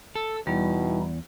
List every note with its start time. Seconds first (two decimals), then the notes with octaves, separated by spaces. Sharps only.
0.15 A4 E6
0.47 E2 B2 G3 D#4 E4